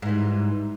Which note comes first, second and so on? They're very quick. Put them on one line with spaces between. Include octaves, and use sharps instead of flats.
G#2 E3 G3